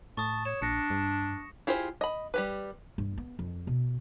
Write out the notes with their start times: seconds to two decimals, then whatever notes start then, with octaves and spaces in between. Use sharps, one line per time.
0.17 A2 A5 C#6 D#6
0.45 C#5 E7
0.62 A#1 D4 A#6 C#7
0.90 G2
1.67 E4 F4 G4 G#4 C5
2.01 D#5 B5
2.34 G3 G4 B4
2.98 G2
3.18 B3
3.39 F2
3.67 B2